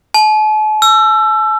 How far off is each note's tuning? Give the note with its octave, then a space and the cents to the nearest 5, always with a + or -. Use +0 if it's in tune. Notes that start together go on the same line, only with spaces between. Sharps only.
A5 -45
E6 +25